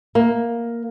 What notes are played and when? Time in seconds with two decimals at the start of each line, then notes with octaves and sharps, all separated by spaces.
0.15 A#3